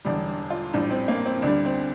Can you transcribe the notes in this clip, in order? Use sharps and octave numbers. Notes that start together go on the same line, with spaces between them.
E1 E2 D3 G3 D5
F4
A#1 A2 G3 D4
C4
A#3
C4
D2 D3 G3 D4
C4